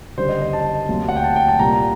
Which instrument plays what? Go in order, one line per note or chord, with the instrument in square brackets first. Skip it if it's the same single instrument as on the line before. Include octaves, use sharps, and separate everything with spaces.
[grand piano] F#1 F#2 D3 G3 C5
D#5
D#5
A5
D2 C3 F#3 A#3
F#5
G5
A5
G5
A5
C2 A#2 G3 A#3 A#5